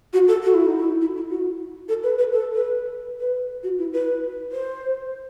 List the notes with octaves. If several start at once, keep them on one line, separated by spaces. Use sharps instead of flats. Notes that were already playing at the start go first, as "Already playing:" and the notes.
F#4
A4
F#4
E4
D#4
E4
E4
E4
F#4
A4
B4
B4
A4
B4
B4
F#4
E4
B4
C5